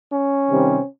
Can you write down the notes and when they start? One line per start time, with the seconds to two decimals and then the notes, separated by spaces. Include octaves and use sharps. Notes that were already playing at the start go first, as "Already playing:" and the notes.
0.11 C#4
0.50 C3 D#3 G3 C4